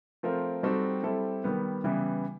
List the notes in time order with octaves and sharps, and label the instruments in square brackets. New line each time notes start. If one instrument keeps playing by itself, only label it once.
[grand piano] F3 A3 C4 F4 A#4
G3 C4 D#4 F#4 A4
G3 C4 E4 A4
D#3 G3 B3
C#3 E3 G3 B3 E4